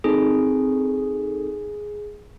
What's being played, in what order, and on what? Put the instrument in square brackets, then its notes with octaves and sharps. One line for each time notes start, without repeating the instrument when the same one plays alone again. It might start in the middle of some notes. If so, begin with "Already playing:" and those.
[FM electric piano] C4 D#4 A4 [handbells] G#4